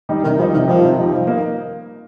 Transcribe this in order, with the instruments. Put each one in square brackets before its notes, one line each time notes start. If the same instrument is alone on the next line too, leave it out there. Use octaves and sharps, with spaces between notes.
[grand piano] D#3 G3 D#4
[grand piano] C3 [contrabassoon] D#3
[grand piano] D#3 G3 D#4 [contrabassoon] F3
[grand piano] C3 [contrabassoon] D#3
[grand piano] D#3 G3 D#4 [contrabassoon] F3
[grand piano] C3
D#3 G3 D#4
F3
A#3 D#4